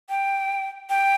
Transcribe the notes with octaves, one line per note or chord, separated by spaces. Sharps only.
G5
G5